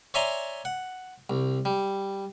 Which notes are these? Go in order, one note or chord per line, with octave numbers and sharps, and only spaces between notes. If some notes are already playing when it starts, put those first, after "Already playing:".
C#5 D5 E5 G#5 A#5 C6
F#5
C2
G3